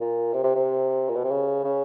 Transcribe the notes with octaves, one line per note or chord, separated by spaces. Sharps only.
A#2
C3
C3
C3
A#2
B2
C3
C#3
C#3